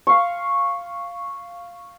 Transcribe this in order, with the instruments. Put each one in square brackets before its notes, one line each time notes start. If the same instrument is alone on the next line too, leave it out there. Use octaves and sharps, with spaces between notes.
[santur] F5 C#6